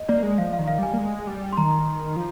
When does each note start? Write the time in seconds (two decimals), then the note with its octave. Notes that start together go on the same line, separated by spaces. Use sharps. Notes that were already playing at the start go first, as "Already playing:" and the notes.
Already playing: D#5
0.09 A#3 D5
0.23 G#3
0.38 F3 F5
0.53 F5
0.59 D#3
0.68 F5
0.78 G3 G#5
0.93 A#3
0.98 G#3
1.27 G3
1.53 C6
1.57 D#3 A#5
2.16 F3